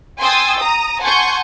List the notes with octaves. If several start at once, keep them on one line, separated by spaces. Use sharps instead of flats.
G5 G#5 C6 D#6 E6 A6
A#5 D#6
F#5 G#5 A5 C6 C#6 G6